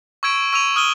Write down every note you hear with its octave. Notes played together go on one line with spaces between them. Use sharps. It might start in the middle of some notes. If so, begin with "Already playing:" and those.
C#6 E6 G#6 D7 E7
C#6 E6 D#7 F7
D#6 F6 D#7 G7